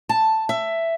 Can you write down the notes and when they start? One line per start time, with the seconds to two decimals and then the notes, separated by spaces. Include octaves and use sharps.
0.09 A5
0.49 E5